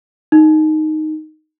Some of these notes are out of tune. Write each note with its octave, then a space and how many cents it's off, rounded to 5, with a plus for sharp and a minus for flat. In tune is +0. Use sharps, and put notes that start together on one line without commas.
D#4 +0